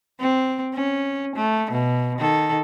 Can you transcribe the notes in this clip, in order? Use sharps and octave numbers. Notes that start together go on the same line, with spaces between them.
C4
C#4
A3
B2
D#3 A4